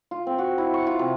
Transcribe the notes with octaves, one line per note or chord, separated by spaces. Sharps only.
F4
C4
F#4
E4
C#6
F4
C3